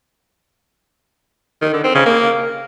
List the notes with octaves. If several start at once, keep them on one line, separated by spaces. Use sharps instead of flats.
D#3
D3
C4
C#3
A#3